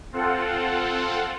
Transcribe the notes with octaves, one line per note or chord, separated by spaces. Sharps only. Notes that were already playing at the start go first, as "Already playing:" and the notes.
C4 F4 A4 F#5